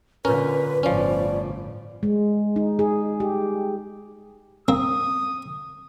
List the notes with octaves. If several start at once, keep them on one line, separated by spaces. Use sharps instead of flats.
A#2 D3 C#4 A#4 B4
G1 A2 F3 C#4 D5
G#3
D#4
G#4
G4
A#3 C4 D#6